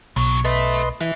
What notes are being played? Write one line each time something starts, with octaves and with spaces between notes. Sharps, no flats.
B1 C#3 F#3
A4 B4 D#5 E5 C6
E3 B4 E5